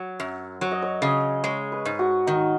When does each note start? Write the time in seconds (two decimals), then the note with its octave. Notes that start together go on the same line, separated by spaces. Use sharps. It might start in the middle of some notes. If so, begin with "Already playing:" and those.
Already playing: F#3
0.20 F#2
0.61 F#3 C#5
0.71 D#5
0.82 C#5
1.02 C#3 D#5
1.43 G#3 C#5
1.72 B4
1.85 G#2
1.99 F#4
2.27 D#3 D#4